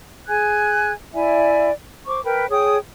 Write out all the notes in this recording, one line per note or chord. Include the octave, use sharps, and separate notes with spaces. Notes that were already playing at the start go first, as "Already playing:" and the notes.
G#4 G#5 F#6 G#6
E4 D5 E5 G#5
C5 C#6 D6
A#4 B4 G5 B5
G#4 C#5 G5 D#6